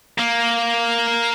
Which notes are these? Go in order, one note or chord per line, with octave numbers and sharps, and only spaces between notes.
A#3